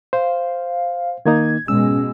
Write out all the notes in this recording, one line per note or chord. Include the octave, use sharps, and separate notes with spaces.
C5 F5
D#3 A#3 D#4 G#6
B2 G#3 C#4 E6